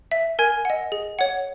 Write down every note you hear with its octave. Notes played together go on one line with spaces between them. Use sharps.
E5
A#4 G#5 G#6
D#5 F#5
G#4
C#5 F#5